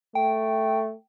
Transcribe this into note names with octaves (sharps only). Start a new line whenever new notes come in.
A3 G5